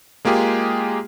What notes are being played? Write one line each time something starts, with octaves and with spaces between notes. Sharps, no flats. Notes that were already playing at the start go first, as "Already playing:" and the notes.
G#3 A#3 F4 G4 G#4